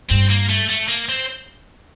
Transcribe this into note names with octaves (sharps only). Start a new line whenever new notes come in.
G2 C4
A#3
A3
A3
A#3
C4